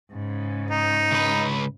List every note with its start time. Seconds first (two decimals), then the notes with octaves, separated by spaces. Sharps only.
0.12 G#2 C#3
0.71 D#4
1.12 C#2 B4